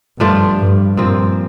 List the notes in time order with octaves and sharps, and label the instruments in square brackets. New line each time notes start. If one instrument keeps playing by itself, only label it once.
[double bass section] G2 [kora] F3 A3 D4 F4
[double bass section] G2
[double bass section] G2 [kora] A#2 F3 C4